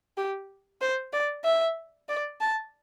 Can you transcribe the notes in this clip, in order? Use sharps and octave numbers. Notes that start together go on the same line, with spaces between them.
G4
C5
D5
E5
D5
A5